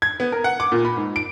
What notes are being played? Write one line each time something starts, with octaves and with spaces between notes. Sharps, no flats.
G#6
B3
A#4
F#5
D6
A#2
B5
G#2
D7